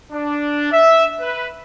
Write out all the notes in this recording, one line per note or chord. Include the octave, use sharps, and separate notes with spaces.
D4
E5
B4